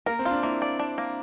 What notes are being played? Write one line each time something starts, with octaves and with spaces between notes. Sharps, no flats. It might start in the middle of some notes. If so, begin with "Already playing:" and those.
A#3 A#4
C4
F4
D4
A#3 E4
D5
D4
A#3